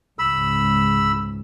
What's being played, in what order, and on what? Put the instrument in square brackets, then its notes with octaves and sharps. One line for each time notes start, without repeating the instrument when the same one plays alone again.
[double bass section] C#2 G#2 [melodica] B5 E6